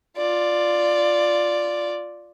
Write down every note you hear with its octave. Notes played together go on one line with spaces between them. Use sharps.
F4 D5